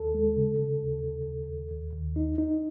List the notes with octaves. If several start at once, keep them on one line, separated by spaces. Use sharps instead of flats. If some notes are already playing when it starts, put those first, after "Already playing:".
Already playing: D#2 A4
G#3
C#3
C#3
D#2
C#3
D#2
D#2
D#2
D#2
D#4
D#4